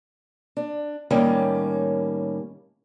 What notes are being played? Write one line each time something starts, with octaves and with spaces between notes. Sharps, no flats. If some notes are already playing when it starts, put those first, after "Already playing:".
D4
A2 D#3 G3 A#3 C#4